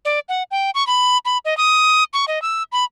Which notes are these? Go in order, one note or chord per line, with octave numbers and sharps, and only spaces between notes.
D5
F#5
G5
C#6
B5
B5
D#5
D#6
C#6
D#5
E6
B5